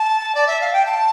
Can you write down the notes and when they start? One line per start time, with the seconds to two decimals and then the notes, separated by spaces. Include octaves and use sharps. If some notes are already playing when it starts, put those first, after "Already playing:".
Already playing: A5
0.35 D5
0.47 E5
0.61 F5
0.73 G5
0.86 A5